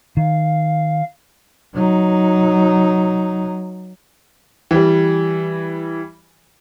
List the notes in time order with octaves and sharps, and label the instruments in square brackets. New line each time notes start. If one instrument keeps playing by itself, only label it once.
[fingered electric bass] D#3 [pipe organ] F5
[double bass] F#3 D#4
[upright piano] E3 G3